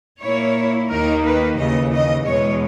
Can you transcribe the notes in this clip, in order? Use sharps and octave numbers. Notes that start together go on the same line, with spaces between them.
A#2 A#3 E4 C#5
D#2 D#3 A#3 D#4 A#4
B4
D#2 C#3 E3 D#5
D#5
E2 B2 G#3 C#5